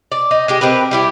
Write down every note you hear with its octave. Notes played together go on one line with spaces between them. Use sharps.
D5
D#4
G#3 D#4 G4
C4 G4 A#4 B4
G3 E4 G4